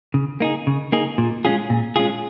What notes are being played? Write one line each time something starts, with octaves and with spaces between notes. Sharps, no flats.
C#3
A#3 D#4 G#4
C#3
A#3 D#4 G#4
A#2
G#3 C#4 F4 G#4
A#2
G#3 C#4 F4 G#4